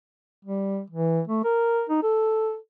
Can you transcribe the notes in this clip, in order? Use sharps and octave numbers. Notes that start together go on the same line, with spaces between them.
G3
E3
A3
A#4
D#4
A4